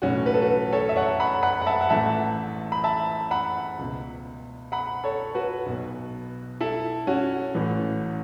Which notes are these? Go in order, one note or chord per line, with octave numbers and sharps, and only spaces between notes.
B1 A2 E3 C#4 F#4
B4
A4
F#4 B4
A4 C#5
E5
C#5 F#5
F#5 B5
F#5 B5
F#5
E5 A5
F#5
A1 A2 E3 E5 A5
B5
E5 A5
F#5 B5
C#2 B2
F#5 B5
A4 C#5
F#4 B4
B1 B2
E4 A4
C#4 F#4
A1 A2 E3